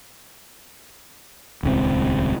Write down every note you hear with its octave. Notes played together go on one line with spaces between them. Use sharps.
D#1 C#2 C#3 C4